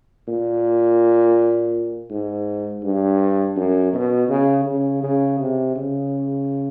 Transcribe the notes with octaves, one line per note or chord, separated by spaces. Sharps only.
A#2
G#2
G2
F#2
B2
C#3
C#3
C#3
C3
C#3